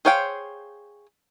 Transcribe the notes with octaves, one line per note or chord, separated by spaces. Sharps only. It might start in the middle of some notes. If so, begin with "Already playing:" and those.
G#4 C5 C#5 F5 G5